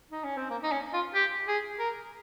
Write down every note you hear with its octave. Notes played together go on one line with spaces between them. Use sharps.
D#4
C#4
C4
A#3
D#4
C#4
F4
G4
G#4
A#4